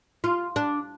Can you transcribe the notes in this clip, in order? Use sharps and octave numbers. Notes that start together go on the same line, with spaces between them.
F4
D4